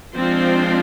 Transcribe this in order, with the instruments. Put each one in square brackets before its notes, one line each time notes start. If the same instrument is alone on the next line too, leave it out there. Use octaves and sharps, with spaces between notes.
[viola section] F3 G#3 C4 D4 F4 C5